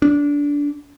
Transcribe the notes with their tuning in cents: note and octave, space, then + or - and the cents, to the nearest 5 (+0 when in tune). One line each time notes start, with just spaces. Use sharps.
D4 -20